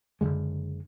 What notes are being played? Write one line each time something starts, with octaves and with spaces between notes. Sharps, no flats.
F#1 E2 D3 G#3